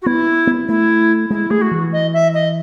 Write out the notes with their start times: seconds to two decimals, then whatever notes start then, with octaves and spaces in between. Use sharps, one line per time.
0.02 F#4
0.06 B3 E4
0.47 B3
0.69 A3 E4
1.30 G#3 E4
1.50 A3 G#4
1.61 F#4
1.71 E3
1.92 D#5
2.13 E5
2.34 D#5